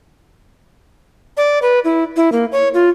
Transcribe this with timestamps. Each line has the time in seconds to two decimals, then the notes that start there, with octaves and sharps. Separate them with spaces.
1.37 D5
1.62 B4
1.84 E4
2.16 E4
2.32 A#3
2.52 C#5
2.74 F4